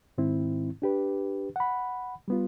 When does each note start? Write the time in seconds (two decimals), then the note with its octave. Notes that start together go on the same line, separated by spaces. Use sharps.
0.18 G#2 D#3 C4 E4
0.82 D4 G4 B4
1.56 F#5 B5
2.28 G3 B3 F4